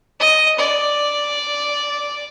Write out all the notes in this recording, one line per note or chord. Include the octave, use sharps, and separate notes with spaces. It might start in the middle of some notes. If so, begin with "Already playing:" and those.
D#5
D5